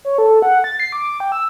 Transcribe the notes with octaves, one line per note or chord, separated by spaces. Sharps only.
C#5
A4
F#5
A6
C7
D6
G5
E6